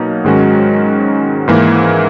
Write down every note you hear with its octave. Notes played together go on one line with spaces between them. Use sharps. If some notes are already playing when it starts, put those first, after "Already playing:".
Already playing: B2 F#3 A#3 D#4
G#2 D#3 G#3 C#4 F#4
G#2 E3 A#3